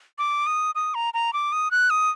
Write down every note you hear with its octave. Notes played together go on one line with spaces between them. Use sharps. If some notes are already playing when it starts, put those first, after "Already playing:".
D6
D#6
D#6
A#5
A#5
D6
D#6
F#6
D#6